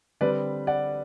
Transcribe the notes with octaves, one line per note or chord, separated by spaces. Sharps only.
D3 G3 C4 B4 D5
D5 F#5